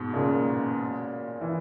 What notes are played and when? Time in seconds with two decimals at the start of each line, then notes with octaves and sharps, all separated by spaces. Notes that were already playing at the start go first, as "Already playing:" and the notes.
Already playing: G#2 B2
0.13 A#2 C#3
1.41 E3